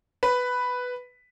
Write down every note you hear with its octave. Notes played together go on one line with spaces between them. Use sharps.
B4